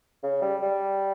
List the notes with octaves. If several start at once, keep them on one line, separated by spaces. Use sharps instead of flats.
C#3
G3
G3